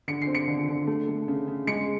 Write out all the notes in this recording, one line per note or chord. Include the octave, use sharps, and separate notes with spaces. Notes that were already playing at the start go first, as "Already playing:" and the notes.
D3 C#7
C7
C4
C#7
D3
D3
A3
A3
C#3
C#3
G#3 C#7